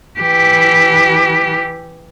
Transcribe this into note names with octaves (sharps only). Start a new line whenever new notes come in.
E3 G4